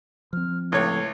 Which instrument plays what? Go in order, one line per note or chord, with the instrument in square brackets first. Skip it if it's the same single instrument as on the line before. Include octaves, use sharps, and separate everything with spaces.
[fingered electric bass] F3 C4 [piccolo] F6
[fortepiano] C#2 C#5 [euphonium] A2 [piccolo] G#6